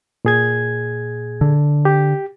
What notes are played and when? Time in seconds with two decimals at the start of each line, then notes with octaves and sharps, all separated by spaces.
0.25 A#2 G#4 G#6
1.41 D3
1.85 G4